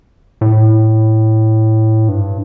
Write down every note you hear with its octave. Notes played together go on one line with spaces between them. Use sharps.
A2
G2